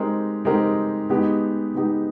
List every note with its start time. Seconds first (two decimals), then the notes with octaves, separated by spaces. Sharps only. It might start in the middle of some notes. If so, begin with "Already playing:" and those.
Already playing: G#3 C4 D#4 G4 A#4
0.45 G#3 C4 D#4 G4 A#4
1.09 G#3 B3 D#4 G4
1.75 G#3 B3 D#4 G4